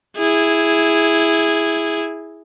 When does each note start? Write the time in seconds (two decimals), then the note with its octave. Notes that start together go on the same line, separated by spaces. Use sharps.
0.17 E4 G#4